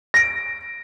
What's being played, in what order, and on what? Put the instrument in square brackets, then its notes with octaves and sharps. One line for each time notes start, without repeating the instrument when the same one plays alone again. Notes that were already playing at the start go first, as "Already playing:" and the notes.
[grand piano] A#6 D7